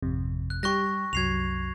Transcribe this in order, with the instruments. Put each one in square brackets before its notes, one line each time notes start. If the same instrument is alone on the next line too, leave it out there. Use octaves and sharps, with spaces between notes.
[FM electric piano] G#1 F2 C3
[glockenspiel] F#6
[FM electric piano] G3 G4 [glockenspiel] C#6 F#6 A#6
[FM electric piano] C2 F#2 F#3 [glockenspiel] G#6 C7 F7